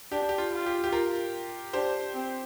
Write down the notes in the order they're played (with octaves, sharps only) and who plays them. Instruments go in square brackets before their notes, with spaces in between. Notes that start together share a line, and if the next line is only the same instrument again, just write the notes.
[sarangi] D4 [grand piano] G4
[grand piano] G4
F4
[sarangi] F4
[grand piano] G4
G4
F4 A#4
[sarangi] D4 [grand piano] G4 C5
[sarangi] C4